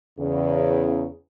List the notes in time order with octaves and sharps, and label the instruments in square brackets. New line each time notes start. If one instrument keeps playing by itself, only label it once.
[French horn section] E2 C#3